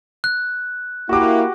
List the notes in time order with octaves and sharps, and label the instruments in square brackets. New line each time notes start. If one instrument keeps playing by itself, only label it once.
[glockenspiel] F#6
[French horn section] A#3 E4 [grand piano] F#4 G4 D6